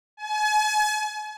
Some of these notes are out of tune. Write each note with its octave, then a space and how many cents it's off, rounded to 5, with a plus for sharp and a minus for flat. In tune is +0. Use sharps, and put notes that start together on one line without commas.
G#5 +40